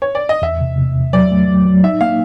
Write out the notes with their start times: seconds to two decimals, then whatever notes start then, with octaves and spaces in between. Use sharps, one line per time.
0.02 C#5
0.15 D5
0.29 D#5
0.42 E2 E5
0.61 C3
0.78 C3
0.95 E2
1.13 F#3 D5
1.31 A3
1.48 F#3
1.65 F#3
1.84 D#4 E5
2.01 A#3 F5